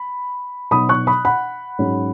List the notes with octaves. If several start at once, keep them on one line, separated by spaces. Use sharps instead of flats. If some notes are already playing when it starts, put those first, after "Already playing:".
Already playing: B5
B2 F#3 D#4 B5 D#6
C#6 F#6
B5 D#6
F#5 B5
G#2 F#3 C#4